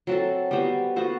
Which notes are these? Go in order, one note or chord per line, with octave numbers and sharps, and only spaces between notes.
F#3 C4 F#4 A4
G3 B3 F#4 C5
B3 F#4 A4 C5